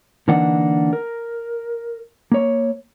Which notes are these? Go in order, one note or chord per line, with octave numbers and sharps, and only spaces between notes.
D3 E3 A#3 D4 D#4 F#5
A#4
A#3 C#5